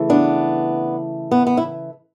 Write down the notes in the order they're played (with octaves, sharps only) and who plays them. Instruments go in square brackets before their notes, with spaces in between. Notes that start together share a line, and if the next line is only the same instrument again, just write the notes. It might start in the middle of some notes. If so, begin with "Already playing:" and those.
Already playing: [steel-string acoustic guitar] C#3 E3 A3
B3 D4
B3
B3
E4